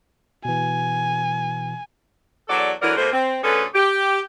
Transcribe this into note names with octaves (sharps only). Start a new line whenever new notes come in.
B2 E3 G#5
E2 F#3 F#4 A4 D5
D3 E3 F#3 D4 A#4 D5
B2 A3 A#3 C4 C5
C4
D2 D3 C#4 G#4 A4 B4
G4